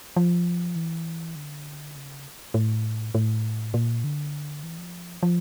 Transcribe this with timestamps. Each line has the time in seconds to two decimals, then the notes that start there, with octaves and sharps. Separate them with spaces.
0.16 F3
0.76 E3
1.36 D3
1.96 C#3
2.54 A2
3.15 A2
3.74 A#2
4.04 D3
4.63 E3
4.78 F3
5.23 F3